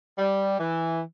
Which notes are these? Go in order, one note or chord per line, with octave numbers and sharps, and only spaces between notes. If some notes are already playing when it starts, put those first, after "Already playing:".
G3
E3